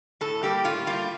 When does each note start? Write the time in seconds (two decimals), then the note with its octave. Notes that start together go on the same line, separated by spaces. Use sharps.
0.21 A2 A4
0.43 G3 A#3 G4
0.64 A2 F4
0.87 G3 A#3 F4